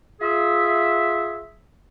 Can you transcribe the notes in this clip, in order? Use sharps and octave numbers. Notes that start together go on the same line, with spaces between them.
F4 G#4 E5